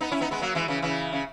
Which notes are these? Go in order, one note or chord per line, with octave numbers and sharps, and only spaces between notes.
B3 D#4
C#4 E4
B3 D#4
G#3 B3
F#3 A#3
E3 G#3
C#3 E3
C#3 E3
C#3